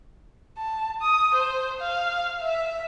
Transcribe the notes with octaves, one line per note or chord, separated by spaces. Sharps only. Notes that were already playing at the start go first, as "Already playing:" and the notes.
A5
D#6
C5
F5
E5